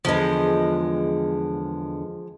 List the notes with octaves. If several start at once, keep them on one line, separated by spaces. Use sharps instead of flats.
E2 D3 F3 G#3 B4